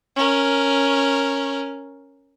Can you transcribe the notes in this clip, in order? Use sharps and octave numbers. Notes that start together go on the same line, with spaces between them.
C#4 A#4